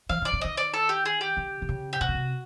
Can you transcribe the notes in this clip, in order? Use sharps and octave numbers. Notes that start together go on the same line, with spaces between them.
E3 F5
D#3 D5
D3
D#3 D#5
D5
A4
G4
G#4
G4
D3
D3
C#3
G4
C3 F#4
C#3
C3